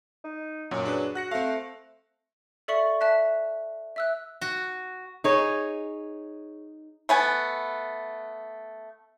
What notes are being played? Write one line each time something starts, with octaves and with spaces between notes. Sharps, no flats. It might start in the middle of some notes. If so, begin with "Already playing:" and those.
D#4
F#2 A#2 F#3
D4 G#4 B4
F#4 F#6 A#6 C#7
A3 C4 F5
A4 D5 E5 C#6 C#7 F#7
E5 A5 F#6 B6
E5 E6 F#6
F#4
D#4 G#4 C#5 D#5
A3 B3 G#5